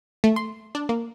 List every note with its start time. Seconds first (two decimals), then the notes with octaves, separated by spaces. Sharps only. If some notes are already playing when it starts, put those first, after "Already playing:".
0.24 A3
0.36 C6
0.75 D4
0.89 A#3